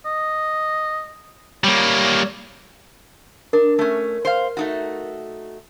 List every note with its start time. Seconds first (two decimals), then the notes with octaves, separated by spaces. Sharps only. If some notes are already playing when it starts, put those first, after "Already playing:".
0.06 D#5
1.64 G3 A#3 C#5
3.53 D4 A#4
3.79 A3 C#4
4.25 C5 F5
4.57 A3 D#4 F#4